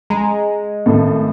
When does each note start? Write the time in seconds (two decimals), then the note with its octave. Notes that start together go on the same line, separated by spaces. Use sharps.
0.10 G#3 A#5
0.86 G#1 A2 A4